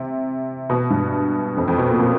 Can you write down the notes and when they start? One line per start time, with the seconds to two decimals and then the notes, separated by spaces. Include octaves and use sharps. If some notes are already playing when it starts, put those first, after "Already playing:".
Already playing: C3
0.70 B2
0.90 G2
1.57 F2
1.68 F2
1.78 B2
1.89 A#2
2.00 A#2